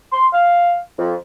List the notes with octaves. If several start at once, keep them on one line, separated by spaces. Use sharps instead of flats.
C6
F5
F2